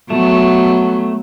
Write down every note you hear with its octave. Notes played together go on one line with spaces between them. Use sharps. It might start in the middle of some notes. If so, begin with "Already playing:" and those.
F#3 A3 B3